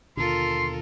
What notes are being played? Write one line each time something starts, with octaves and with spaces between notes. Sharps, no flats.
D#2 B2 D3 F4 A4 A#4 C6